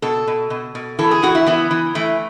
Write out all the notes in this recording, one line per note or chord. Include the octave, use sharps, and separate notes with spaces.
B2 A4
B2
B2
B2
E3 A4
G#4
E3 F#4
E4
E3 B3
E3
E3 A3